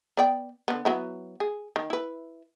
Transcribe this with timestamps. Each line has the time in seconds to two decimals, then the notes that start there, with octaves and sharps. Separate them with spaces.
0.17 B3 D5 G5
0.68 D3 B3
0.85 F#3 B3 E4
1.40 G#4
1.76 D#3
1.90 E4 B4